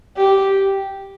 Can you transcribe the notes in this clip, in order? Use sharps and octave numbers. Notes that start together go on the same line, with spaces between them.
G4